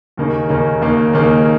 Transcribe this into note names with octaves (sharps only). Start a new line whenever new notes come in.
D#2 C#3 A#3 D#4
D#2 C#3 A#3 D#4
D#2 C#3 A#3 D#4
D#2 C#3 A#3 D#4